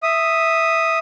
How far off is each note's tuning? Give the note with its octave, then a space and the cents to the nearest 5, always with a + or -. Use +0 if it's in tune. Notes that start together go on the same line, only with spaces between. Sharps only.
E5 +0 D#6 +0